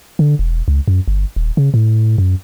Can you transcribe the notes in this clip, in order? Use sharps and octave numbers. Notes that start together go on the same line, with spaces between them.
D3
E1
C#2
F#2
G1
D#1
C#3
A2
F#2